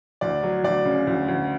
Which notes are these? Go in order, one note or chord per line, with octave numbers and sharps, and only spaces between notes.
D2 D5
F#3
D2 D5
C#3
D2
D2